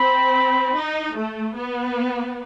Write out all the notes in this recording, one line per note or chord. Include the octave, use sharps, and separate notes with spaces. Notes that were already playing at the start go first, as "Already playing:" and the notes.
Already playing: C4 B5
D#4
A3
B3